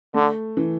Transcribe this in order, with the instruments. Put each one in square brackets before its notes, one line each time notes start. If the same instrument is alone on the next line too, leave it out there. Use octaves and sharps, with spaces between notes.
[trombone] D3 [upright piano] A3
[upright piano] E3